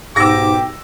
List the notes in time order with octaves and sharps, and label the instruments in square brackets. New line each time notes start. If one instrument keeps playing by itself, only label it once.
[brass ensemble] B1 G4 G5 [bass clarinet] G#2 [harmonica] D6 [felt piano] E6 A#6